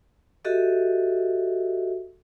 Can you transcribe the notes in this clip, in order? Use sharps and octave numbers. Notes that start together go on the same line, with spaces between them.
F#4 G4 A4 D#5 E5